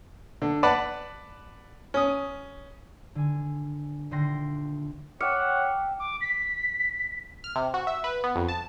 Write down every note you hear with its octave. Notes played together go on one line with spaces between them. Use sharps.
D3
B4 D5 F#5 A5 B5
C#4 D#6
D3 G#5
D#1 D3 G5 C6 A#6
C#5 E5 F#5 G5 D6 F6 C#7
D6
B6
F6
C3
F#4
E5
B4
B3
F2
A5